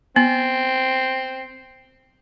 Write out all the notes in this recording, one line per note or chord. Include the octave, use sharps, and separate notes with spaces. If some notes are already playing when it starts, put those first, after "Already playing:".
B3 C4